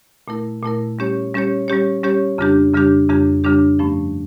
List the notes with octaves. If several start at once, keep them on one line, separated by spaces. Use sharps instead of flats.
A#2 A3 E4 A#4
A#2 A3 E4 A#4
G3 C#4 G4 C#5
G3 C#4 G4 C#5
G3 C#4 G4 C#5
G3 C#4 G4 C#5
F2 C#3 G3 D4 G4
F2 C#3 G3 D4 G4
F2 C#3 G3 D4 G4
F2 C#3 G3 D4 G4
G2 F3 A3 C#4